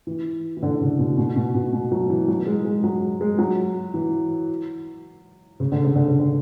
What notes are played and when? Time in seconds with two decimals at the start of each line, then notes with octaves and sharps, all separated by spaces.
0.07 E3
0.57 E3
0.63 D3
0.81 C#3
0.99 B2
1.17 B2
1.36 B2
1.54 B2
1.73 B2
1.92 F#3
2.10 E3
2.28 F#3
2.46 G#3
2.65 G#3
2.84 F#3
3.21 G#3
3.38 F#3
3.94 E3
5.60 C#3
5.72 D3
5.84 C#3
5.95 D3
6.08 C#3
6.19 D3